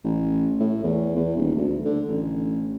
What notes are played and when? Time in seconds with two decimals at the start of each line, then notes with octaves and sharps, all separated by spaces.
0.04 A1
0.60 A2
0.84 E2
1.16 E2
1.37 D#1
1.57 D2
1.85 D3
2.09 A1